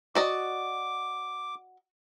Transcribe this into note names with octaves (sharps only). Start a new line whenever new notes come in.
F#4 D5 D#5 D6